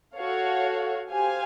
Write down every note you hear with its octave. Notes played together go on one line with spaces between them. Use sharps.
F#4 A4 C#5 F5
G4 C5 F5 G#5